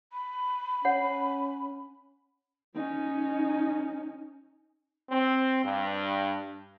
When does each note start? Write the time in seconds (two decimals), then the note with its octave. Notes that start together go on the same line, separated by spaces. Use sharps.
0.13 B5
0.85 C#4 C#5 F#5
2.74 C#4 D#4
5.10 C4
5.64 G2